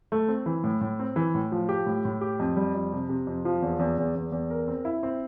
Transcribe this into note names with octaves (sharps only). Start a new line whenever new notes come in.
A3
C4
E3
A2
A2
C4
E3
A2
F3
G4
A2
A2
G4
F2
G3
F2
C3
C3
F2
F3
E2
E2
E2
E2
E2
A#4
C4
E4
C4